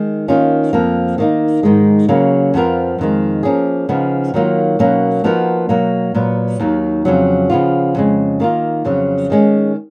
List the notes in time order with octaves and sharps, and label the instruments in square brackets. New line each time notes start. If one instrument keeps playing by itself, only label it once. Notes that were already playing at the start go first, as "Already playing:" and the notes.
Already playing: [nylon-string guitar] D#3 G#3
D#3 A#3 C#4 F4
F2 F3 A#3
D#3 A#3 D#4
G#2 D#3 G#3
C#3 F#3 A#3
F2 F3 B3 F4 A#4
F2 D#3 G#3
F3 A#3 C#4 G#4
C#3 F3 B3 D#4
D#3 F#3 A#3 F4
B2 F#3 A#3 C#4
F3 B3 D#4 F#4 A#4
B2 F#3 A#3
A#2 F#3 B3
D#2 D#3 F#3
F2 C#3 F#3
C#3 F3 B3 F4
F2 C#3 G#3
D#3 A#3 F4
F2 C#3 F#3
D#3 G#3 C#4